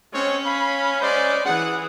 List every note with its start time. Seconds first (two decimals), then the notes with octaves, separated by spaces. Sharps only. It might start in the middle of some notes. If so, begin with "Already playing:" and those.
0.14 G#3 C4 C#4 C#5
0.46 F5 B5
1.01 G#3 C5 D5
1.46 E3 G#4 F#5